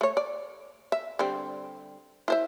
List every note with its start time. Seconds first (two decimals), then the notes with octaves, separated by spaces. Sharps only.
0.01 A3 C#5
0.17 D5
0.92 E5
1.19 D3 G3 C4
2.28 E4 C5 E5